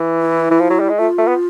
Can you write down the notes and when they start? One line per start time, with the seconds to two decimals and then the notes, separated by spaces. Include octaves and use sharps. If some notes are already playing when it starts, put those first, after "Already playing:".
Already playing: E3
0.21 E4
0.51 E3
0.60 F3
0.70 F#3
0.80 G3
0.89 G#3
0.98 A3 F4
1.18 A3
1.28 B3